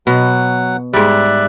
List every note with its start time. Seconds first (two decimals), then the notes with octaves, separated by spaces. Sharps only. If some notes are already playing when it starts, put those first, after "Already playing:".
0.07 B2 F#3 F#5
0.94 G#2 G3 D5 E5 F#6